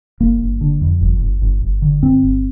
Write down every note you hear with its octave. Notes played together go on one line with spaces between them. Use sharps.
G1 A#3
G1
D3
F2
G1
G1
G1
G1
D3
G2 C4
G1